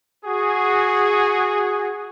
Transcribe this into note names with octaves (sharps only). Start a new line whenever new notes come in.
F#4 G#4